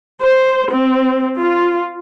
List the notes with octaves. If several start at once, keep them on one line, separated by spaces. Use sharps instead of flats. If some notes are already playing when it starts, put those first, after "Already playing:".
C5
C4
F4